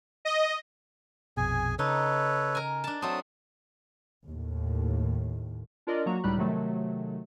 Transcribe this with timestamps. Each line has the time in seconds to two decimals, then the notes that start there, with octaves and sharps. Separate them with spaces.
0.25 D#5
1.37 A#1 F2 B2 G#4 G#5
1.79 C#3 D#4 A4 B4 C#5
2.55 A#4 G#5
2.84 D4 A5
3.02 F#3 A3 C4 A5 D#6
4.25 D#2 A2
5.87 D4 F4 A#4 D5 D#5
6.06 F#3 A#3 F#4 A#5 C#6
6.23 C#2 A2 G3 D#4 B5 F#6
6.38 C3 D#3 F#3 A3